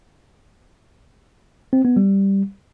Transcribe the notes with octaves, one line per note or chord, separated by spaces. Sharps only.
C4
B3
G3